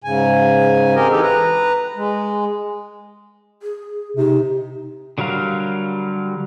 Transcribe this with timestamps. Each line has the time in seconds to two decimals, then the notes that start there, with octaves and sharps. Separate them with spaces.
0.04 G#2 C#3 G#5
0.95 C4 G4 G#4 A#4 D#5
1.10 E3 D#4 G4 A4
1.23 B4 A#5
1.96 G#3
3.63 G#4
4.17 C3 D#4
5.18 D3 F#3 G3 A#4 F5